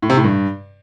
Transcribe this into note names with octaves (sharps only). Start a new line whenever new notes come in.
A2
C3
A2
G2